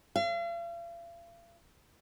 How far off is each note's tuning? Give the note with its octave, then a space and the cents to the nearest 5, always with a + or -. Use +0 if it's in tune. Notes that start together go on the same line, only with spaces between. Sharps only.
F5 -40